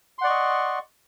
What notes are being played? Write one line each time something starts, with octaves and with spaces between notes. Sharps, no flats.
D5 D#5 F#5 C6 C#6